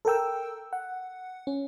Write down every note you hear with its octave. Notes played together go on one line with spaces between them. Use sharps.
A4 A#4 G5 E6
F#5
C#4